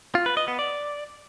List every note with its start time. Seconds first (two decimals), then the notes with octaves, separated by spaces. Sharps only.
0.15 F4
0.26 B4
0.37 D#5
0.48 B3
0.59 D5